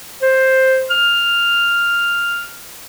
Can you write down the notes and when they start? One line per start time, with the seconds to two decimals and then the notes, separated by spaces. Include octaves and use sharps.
0.22 C5
0.90 F6